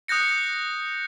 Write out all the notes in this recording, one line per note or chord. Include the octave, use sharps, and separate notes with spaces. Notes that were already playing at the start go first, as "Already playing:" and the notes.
D#6 F#6 G6 A#6 C#7